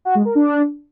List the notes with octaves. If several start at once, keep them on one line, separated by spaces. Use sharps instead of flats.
F#4
G#3
A#4
D4